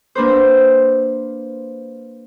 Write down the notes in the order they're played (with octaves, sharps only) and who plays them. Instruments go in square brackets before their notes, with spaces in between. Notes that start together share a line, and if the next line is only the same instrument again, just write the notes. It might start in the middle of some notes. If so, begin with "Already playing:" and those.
[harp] A#3 D4 B4 C5